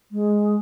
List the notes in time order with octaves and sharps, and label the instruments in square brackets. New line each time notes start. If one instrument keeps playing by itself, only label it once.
[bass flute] G#3